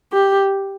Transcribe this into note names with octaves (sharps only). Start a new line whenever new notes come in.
G4